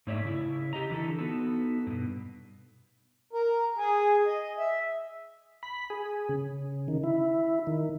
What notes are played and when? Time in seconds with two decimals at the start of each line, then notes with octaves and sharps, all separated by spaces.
0.07 G#2 A3 C#5 D5 E5
0.25 C#3 E4
0.73 G4 D#5 A#5
0.90 D3 E3 E4 A4
1.19 B3 D#4 F#4 A4
1.87 G2 B2
3.33 A#4
3.77 G#4
4.26 D#5
4.58 E5
5.63 B5
5.90 G#4
6.29 C#3
6.88 D#3
7.04 E4
7.67 D#3